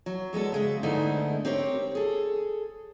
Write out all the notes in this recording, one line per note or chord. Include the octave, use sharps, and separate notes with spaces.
F#3
G3 G#3 B3 A4
C#3 G#3 E5
G#2 D3 A3 B3 D#4 E4
C4 G4 A#4 C#5
G#4 A4